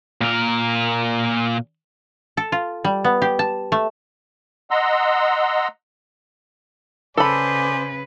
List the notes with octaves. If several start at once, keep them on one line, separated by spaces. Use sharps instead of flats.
A#2 A#4
A4
F4
G3
B3
G4
A5
A3
D#5 F#5 A#5 C6 E6
C#3 G#4 A4 B4 C5 D5 B5